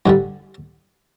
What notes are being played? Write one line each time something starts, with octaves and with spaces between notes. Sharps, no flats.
G2 D3 G3